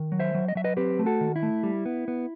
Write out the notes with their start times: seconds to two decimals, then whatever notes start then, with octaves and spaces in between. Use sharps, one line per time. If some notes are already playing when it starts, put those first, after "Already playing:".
Already playing: D#3
0.12 F#3
0.19 C5 E5
0.35 F#3
0.48 D#5
0.55 F#3 E5
0.64 B4 D#5
0.77 C4 G4 B4
0.99 A3
1.06 F#4 A4
1.21 D#3
1.36 E4
1.43 A3
1.63 G3
1.85 B3
2.08 B3